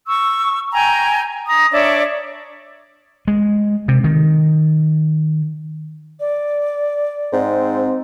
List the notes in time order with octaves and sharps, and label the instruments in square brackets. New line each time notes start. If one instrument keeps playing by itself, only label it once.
[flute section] C#6 E6
G5 G#5 A#5
A#5 D#6
D4 C#5 D5 E5
[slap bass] G#3
C3
D#3
[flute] D5
[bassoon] G#2 [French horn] C4